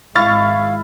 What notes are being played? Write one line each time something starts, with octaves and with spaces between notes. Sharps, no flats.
G#1 G#3 E4 F5 C#6 F6 A6